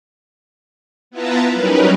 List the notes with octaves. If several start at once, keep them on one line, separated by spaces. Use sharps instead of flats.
B3 E4 F4 B4 A5 A#5
F#3 G3 C#4 D#4 A#4 B4